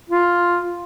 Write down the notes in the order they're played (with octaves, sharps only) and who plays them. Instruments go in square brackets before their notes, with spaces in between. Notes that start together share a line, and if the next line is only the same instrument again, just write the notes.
[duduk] F4